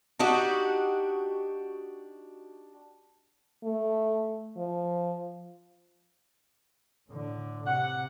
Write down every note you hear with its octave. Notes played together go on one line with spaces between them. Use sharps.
D4 D#4 F#4 G4
A3
F3
A2 D3
C3 F#5